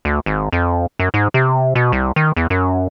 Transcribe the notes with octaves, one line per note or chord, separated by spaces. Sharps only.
D2
G#1
F2
F#2
G#2
C3
B2
C2
D#3
E2
F#2